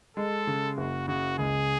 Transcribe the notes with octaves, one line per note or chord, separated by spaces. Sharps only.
G#3 A4
C#3
F#1 F#4
C#3 F#4
C#2 G#4